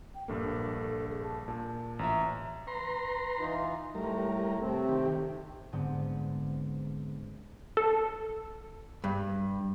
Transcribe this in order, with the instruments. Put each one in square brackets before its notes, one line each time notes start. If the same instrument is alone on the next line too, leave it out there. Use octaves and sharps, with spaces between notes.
[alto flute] G5
[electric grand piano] A#1 G2 A#3 [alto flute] A4
[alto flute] G#4
A5
[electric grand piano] A#2 [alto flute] A5
[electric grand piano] A1 E5 [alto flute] A#5
[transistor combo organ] B4 A#5 C6
[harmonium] E3 D#4 F4
[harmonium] A2 A3 [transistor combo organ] G3 A#4
[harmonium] C3 A3 C4
[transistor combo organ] D#3 G4
[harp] G#2 D3 B3 C4
[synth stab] A4
[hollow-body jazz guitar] G2